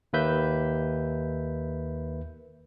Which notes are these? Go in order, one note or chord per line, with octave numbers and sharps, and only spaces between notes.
D#2 A#3 B4 E5 G6